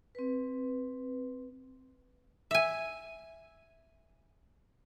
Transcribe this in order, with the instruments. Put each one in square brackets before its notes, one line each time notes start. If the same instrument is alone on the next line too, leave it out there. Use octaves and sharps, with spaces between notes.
[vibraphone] C4 B4
[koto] E5 G#5